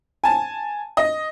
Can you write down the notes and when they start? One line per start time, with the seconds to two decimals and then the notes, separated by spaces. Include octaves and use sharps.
0.24 G#5 A5
0.97 D#5